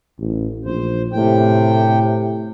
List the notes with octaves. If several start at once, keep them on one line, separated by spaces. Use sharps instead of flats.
A1
A#1 C5
A2 C3 G5